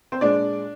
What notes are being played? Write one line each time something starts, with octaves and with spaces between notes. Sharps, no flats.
C4 C5
A#2 G#3 D4 D5